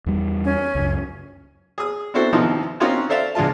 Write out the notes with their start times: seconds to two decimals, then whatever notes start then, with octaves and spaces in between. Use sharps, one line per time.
0.06 E2 G3
0.44 C#4 G#5
0.75 C#2 F#2
1.78 G#4 D#6
2.14 C4 D4 E4 F#4 A4 C5
2.33 D#2 C3 E3 F3 D#4
2.80 C4 C#4 D#4 F4 F#4 A#4
3.09 A4 C5 D5 E5 F5
3.35 C#2 G#3 D4 F4 A5